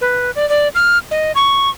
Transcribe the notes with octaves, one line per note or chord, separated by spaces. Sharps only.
B4
D5
D5
F6
D#5
C#6